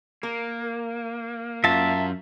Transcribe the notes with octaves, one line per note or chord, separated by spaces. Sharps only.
A#3 A#4
F#2 F4 E5 A5